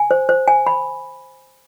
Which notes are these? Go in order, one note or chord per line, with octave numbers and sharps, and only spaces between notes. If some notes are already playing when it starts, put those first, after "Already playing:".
Already playing: G#5
C5
C5
G#5
B5